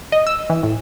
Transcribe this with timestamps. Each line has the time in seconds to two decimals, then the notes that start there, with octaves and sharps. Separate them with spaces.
0.12 D#5
0.27 E6
0.50 E3
0.63 A2